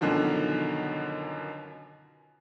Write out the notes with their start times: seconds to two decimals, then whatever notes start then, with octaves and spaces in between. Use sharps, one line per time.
0.01 F#2 B2 D3 D#3 F3